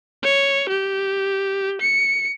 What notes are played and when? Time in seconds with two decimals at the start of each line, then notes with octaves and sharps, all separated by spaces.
0.23 C#5
0.69 G4
1.81 C#7